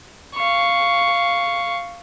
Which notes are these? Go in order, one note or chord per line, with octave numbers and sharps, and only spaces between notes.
F5 C#6